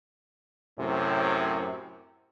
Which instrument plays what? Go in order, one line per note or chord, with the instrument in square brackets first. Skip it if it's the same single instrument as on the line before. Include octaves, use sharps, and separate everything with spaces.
[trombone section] F#2 A2 C3